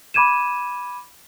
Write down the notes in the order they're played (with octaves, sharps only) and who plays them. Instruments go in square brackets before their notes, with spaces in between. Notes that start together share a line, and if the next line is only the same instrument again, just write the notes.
[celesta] B5 D6 G#6 D#7 E7